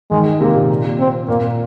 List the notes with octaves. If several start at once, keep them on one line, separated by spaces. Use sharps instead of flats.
D#3 G#3
C3 A#3
A#2
C4
A#2 A#3